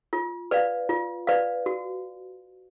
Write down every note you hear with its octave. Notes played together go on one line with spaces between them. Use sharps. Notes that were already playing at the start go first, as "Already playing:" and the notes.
F4
B4 D5 F5
F4
B4 D5 F5
F#4